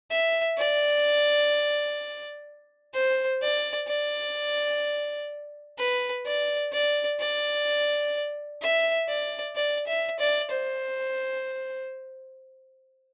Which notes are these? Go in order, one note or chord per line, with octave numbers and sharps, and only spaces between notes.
E5
D5
C5
D5
D5
B4
D5
D5
D5
E5
D5
D5
E5
D5
C5